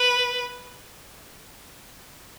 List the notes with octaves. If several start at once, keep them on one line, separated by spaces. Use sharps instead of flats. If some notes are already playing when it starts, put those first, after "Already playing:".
Already playing: B4